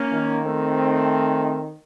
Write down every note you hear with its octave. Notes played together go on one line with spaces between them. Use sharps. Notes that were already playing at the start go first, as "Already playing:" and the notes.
Already playing: A#3 C#4
D#3
A3 C4